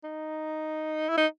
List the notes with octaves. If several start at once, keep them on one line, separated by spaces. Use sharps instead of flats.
D#4
E4
D#4